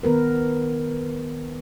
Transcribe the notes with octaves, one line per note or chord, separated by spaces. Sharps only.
D#3 B3 A#4 B4